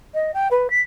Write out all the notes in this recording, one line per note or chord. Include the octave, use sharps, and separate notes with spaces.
D#5
G5
B4
B6